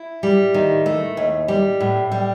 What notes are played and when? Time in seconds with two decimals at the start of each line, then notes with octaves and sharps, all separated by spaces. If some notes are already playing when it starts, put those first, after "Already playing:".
Already playing: E4
0.23 G3
0.54 D#3
0.86 A3
1.17 D#2
1.48 G3
1.80 A2
2.12 G3